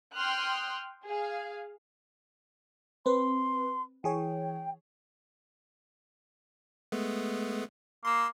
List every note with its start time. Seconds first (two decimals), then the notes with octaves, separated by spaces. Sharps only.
0.16 G5 C6 D#6 F6 F#6
1.05 G#4 F5
3.06 C4 B4 C6
4.04 E3 G#4 C#5 G5
6.92 G#3 A3 B3
8.05 A#3 C6 E6